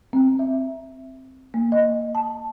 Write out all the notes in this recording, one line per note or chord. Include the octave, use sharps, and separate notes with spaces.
C4
E5
A#3
D#5
A5